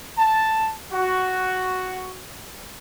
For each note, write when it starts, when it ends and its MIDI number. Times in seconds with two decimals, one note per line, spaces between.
0.19 0.72 81
0.92 2.22 66